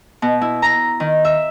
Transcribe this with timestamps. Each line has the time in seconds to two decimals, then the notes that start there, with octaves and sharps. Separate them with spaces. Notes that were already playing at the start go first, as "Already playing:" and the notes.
0.22 B2
0.41 E4
0.62 A#5
1.00 D#3
1.25 E5